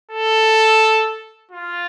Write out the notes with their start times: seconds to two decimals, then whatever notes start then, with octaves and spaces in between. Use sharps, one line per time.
0.12 A4
1.52 F4